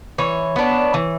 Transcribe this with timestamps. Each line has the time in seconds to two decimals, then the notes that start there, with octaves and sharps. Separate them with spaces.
0.18 E3 C#5
0.56 B3 D4
0.94 E3